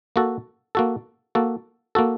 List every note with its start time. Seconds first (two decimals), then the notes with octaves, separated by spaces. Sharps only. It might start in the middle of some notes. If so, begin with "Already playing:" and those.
0.16 A#3 F#4 A4
0.75 A#3 F#4 A4
1.35 A#3 F#4 A4
1.95 A#3 F#4 A4